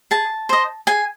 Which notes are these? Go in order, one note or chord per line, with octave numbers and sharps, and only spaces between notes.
G#4 A5
C5 D#5
G#4 G#5